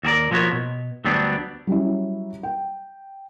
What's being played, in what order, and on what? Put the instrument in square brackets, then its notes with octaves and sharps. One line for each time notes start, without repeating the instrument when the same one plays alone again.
[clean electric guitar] D#2 F#4 G#4 A#4 D5
B1 F3 A#3 B3 F#4 C#5
B2
D2 F#3 G3 B3 D4
[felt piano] F#3 G3 C#4 E4
G5